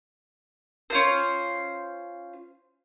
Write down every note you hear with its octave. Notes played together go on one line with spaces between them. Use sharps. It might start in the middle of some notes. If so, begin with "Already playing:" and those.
C#4 F4 C5